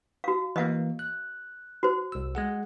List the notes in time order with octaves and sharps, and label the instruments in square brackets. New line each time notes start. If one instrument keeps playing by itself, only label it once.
[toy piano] F#4 F5
[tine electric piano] E3 A#3 [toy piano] D#5 F5
[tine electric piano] F#6
[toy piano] F#4 C5
[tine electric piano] C2 E6
G#3 G#4 F#5